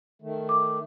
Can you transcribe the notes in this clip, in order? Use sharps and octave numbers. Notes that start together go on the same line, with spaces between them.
D#3 A3
D6